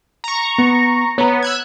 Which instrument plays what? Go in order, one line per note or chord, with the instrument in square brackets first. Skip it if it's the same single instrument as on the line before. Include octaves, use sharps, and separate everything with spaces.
[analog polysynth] A#5 C#6
[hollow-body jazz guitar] B3
[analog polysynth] B3 [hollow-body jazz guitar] C#5 A#5
[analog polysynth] E6 F#6 G#6